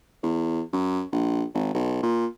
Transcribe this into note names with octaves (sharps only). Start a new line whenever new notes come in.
E2
F#2
A#1
G#1
B1
A#2